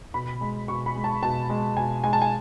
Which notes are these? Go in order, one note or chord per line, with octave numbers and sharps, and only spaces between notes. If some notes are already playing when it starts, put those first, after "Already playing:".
B2 B5
G#3
B2 C#6
B5
G#3
A5
B2 A5
G#3
B2 G#5
G#3 G#5
A5
G#5